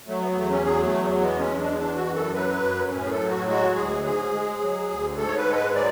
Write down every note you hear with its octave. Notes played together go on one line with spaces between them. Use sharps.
F#3 A3
B3
B3
E2 A3
C#4
F#3 G#4
A3
E2
G#3 B3
C#4
E2
D4
E3 D4
F#4
F#2
A4
F#3 B4
F#2
A2 C#4
G#4
A4
F#3
F#4
G#3 F#4
D2 G#4
G#2 G#4
G#3
F#3
D2
G#2 A4
C#5
B4
G#3 A4
B4
F#3 D5